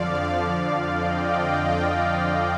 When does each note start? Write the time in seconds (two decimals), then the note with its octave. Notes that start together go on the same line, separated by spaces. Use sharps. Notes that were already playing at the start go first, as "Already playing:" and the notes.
Already playing: F2 D3 F3 D5 F5
0.75 D#5 G5